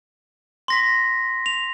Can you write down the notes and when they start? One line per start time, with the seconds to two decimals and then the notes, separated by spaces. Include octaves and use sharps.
0.68 C6 A#6 B6
1.46 F7